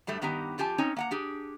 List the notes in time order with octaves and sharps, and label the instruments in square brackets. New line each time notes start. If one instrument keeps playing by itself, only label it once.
[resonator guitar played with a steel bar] G2 F#3 G3 A3
G2 D#3 B3 G4 A#5
F2 F4 G4 G#5 A5
C4 C#4 D#4 C#5
A#3 F#5 A#5
D4 G4 G#4